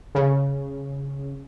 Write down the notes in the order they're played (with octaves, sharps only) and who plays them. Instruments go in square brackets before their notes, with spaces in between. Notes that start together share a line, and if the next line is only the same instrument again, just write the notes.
[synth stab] C#3